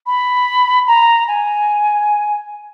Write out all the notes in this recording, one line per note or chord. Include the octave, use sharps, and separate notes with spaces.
B5
A#5
G#5